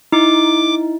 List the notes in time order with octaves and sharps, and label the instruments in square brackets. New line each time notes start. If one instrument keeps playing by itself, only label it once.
[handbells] D#4 [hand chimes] E4 [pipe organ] D6